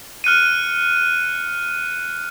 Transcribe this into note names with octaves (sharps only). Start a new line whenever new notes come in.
F6 F#6 C#7 D#7